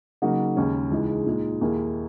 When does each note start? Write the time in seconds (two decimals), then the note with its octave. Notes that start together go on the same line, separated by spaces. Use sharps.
0.22 C#3 F#3 A#3 D#4 F#4
0.57 D#2 C#3 G#3 C#4
0.91 C#2 C#3 E3 G#3 D#4
1.26 A#2 G#3 D#4
1.61 D#2 D#3 A#3 E4 G#4